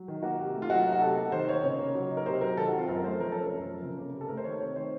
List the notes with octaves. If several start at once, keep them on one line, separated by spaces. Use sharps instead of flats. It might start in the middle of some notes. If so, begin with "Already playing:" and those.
Already playing: F#3
D#3
A#3 F#4
C3
A3
F4
F#3 F#4
D#4
F#4
C3 A4
A#3
D#3 C5
D#4 C#5
C#3 C#5
A#3
F#3
D#4
A#4
C3 C5
F#3 A#4
D#3 A4
F#4
C4 F4
F#2 A#4
A3 C5
F3 A#4
C#4 A4
A#4
F#2
F3
C#3
A#3
C3
A4
A3 A#4
C5
D#3 C#5
C4 C#5
D#3 C5